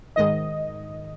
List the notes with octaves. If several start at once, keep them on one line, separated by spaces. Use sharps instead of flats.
G#2 D#3 D#5